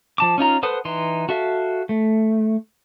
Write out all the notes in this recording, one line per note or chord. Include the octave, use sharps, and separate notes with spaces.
F3 A5 D6
C#4 D#4 F4 A#5
A4 B4 C5 F#5 D#6
E3 D#4 C6
F#4 A4 E5 F5
A3